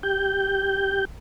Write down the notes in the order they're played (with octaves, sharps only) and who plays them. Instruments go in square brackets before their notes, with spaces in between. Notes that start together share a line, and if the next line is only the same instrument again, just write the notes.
[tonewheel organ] G4 G6